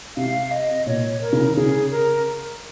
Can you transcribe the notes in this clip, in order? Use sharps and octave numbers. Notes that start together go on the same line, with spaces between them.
C3 F5
D#5
A#2 C#5
A#4
C#3
D#3
C#3 G#4
A#4